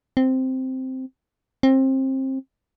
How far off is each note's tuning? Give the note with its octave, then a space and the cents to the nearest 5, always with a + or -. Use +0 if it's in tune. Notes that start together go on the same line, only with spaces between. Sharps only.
C4 -5
C4 +25